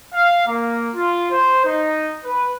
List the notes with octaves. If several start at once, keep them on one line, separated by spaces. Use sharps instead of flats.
F5
A#3
F4
C5
D#4
B4